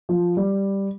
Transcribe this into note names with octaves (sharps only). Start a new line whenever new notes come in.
F3
G3